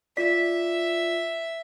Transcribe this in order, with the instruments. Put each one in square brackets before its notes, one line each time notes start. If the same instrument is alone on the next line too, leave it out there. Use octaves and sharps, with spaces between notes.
[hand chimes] F4 D5 [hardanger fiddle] E5 [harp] B6